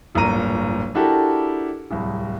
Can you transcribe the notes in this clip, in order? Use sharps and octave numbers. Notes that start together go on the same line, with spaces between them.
D1 G1 A#2 A#4 A#5 D#7
D4 E4 F#4 G4 A4 A#4
D1 C2